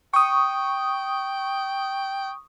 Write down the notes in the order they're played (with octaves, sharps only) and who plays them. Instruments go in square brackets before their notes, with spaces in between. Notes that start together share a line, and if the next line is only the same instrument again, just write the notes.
[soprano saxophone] G5 [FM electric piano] C#6 D#6